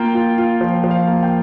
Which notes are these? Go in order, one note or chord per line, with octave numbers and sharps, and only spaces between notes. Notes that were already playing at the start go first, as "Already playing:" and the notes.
Already playing: A#3 F4 G5
F4
F4
F3
F3
F5
A#3
G5